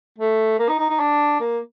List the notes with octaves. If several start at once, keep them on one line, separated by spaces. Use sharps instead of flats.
A3
A#3
D#4
D#4
D#4
D4
A#3